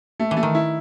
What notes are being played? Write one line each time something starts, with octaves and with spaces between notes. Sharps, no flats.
A3
E3
A3
D#3
E4